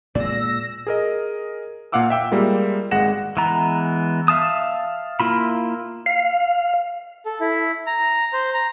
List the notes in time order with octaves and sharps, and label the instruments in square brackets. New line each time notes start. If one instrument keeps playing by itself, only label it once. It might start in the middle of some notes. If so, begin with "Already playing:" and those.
[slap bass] A#2 G#3 [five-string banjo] D5 [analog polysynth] E6 A#6
[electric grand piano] G#4 A#4 D#5
A#2 A#3 F5 F#5 D6 E6
E5 G5 E6
G3 G#3 A#3 F4
G#1 G#3 F#5 A#6 E7
[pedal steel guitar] E3 G#3 B3 A#5
E5 F5 A5 D#6
A#3 E4 F4 B5
[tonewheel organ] F5
[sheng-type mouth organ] A4
E4
A#5
C5
A#5